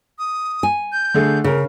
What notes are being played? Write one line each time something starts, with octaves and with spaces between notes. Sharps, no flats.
D#6
G#5
G6
D3 A3 G#4
C#3 G#4 A#4